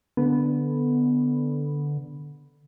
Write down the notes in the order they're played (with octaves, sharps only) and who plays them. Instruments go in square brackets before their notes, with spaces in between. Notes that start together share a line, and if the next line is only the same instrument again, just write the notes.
[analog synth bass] D3 [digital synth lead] B3